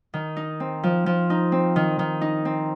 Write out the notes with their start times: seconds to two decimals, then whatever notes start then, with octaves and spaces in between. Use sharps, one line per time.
0.14 D#3
0.36 D#4
0.60 C4
0.83 F3
1.06 F3
1.30 D#4
1.52 C4
1.76 D#3
1.99 D#3
2.21 D#4
2.45 C4